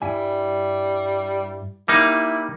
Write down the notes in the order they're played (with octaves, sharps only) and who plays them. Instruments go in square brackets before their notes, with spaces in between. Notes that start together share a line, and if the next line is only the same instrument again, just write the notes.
[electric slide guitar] G2 E4 G#5 [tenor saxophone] G3
[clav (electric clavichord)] G3 A#3 D#4 [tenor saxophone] E4